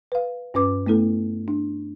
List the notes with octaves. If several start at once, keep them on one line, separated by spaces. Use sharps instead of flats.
B4 F5
G2 C#4 B4 D6
A3 B3 E4 A4
D4